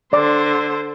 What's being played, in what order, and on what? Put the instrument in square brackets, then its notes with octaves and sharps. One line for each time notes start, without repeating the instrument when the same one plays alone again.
[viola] D3 C5 [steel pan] D5 D6